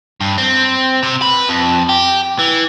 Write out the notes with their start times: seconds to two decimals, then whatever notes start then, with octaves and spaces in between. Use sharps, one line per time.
0.20 G2
0.38 C4
1.03 C3
1.22 B4
1.49 F2
1.89 G4
2.39 E3